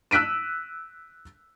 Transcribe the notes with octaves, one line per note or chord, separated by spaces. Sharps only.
E6 F#6 B6 D7 D#7